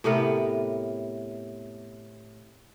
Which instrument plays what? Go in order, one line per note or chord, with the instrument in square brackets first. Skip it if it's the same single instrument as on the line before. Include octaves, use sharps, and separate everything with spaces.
[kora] A2 C3 B3 A#4